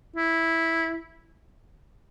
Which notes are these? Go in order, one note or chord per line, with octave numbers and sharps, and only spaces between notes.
E4